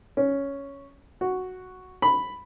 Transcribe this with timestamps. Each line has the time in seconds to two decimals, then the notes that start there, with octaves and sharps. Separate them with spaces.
0.17 C#4
1.21 F#4
2.02 B5